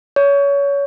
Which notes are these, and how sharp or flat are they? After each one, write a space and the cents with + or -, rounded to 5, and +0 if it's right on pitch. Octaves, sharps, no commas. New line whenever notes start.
C#5 +25